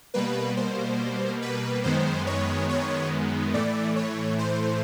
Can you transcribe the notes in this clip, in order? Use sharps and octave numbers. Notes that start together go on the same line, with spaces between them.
B2 G3 A#3 B4
C5
B4
F#2 D#3 G#3 B3 C5
C#5
C#5
A2 E3 A3 D5
C#5
C5